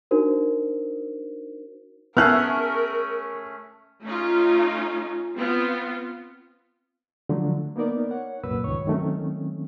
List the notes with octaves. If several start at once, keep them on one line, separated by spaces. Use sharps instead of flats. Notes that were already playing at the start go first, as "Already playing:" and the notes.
D4 D#4 F#4 A#4 C5
A3 B3 C#4 E4 G#4 A#4 F6 F#6
A3 C#4 D#4 F4
B3 C4 F4
D3 F3 F#3 A3
A#3 B3 D#4 A#4 D5
C#5 F#5
C2 F#2 A#2 A#3 B4 E6
C#2 G2 D#3 C#5 C#6
D#3 F#3 A3 C4 C#4